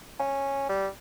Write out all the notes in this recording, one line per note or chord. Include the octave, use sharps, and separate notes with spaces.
C#4
G3